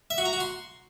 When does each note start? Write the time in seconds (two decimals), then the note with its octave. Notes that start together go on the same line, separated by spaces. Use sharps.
0.10 E5
0.18 F#4
0.25 A#5
0.33 F#4
0.40 C6